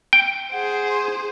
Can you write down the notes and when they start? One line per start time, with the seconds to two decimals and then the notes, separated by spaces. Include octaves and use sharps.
0.13 G5
0.52 G#4 C5 F#5
0.89 C6